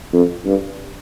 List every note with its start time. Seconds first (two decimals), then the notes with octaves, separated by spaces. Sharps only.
0.13 F2
0.45 G2